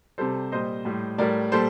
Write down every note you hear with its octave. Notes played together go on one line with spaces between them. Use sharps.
C3 G3 A4 C5
A#2 G3 C5 D#5
A2 G3
A2 G3 A#4 D5
A#2 G3 A4 C5